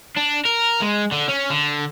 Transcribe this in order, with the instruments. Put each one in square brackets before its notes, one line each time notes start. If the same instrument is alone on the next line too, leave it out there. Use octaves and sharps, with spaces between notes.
[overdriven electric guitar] D4
A#4
G#3
D3
C#4
D3